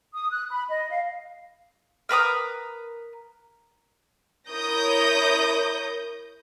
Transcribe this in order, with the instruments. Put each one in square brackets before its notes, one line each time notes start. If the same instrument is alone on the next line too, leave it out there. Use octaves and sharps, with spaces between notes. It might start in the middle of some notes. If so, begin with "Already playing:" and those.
[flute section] D#6
F#6
B5
D#5
F5
[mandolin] A#4 B4 A#5 D#6
[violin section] E4 A#4 C#5 D#6 G6 A#6